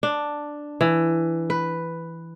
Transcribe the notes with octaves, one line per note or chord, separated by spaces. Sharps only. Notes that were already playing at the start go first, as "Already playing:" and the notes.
D4
E3
B4